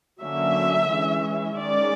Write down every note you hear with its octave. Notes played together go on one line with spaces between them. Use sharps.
D3 F#3 A#3 C#4 E5
E3 G#3 C#4
D#3 G#3 C#4 D5